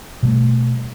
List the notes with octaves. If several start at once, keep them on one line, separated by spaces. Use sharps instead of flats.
B2 G3 A3